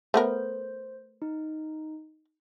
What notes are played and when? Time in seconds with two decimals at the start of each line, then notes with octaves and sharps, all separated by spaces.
0.14 A3 B3 A#4 C5
1.22 D#4